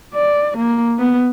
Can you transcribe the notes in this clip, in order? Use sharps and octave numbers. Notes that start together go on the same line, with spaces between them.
D5
A#3
B3